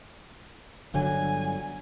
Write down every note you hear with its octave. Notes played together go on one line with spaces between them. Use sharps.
G1 D3 F#3 G#5